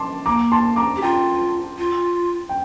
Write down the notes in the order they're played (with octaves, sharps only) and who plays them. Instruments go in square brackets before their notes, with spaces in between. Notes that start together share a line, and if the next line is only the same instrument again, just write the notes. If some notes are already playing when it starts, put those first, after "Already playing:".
Already playing: [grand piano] A5 C6 D6
[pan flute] A#3 [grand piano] A#5 D6
[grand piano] A5 C6
A#5 D6
[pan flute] G4
[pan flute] F4 [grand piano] G5 A#5
[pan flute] F4
[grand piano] G5